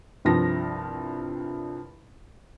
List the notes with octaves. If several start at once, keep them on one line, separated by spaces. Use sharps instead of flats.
C2 G2 F3 A#6